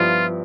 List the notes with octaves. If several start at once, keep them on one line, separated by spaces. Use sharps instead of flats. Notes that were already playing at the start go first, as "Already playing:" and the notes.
Already playing: G2 F3 B3 E4 F4